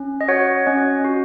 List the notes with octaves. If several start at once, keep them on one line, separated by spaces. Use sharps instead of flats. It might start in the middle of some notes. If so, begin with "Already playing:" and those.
Already playing: C#4
D#5
F#4 C#5 F#5
C#4 D#5
F#4